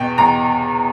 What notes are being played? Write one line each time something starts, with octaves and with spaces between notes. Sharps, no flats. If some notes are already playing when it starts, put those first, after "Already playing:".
Already playing: E2 B2 G5
E2 A#5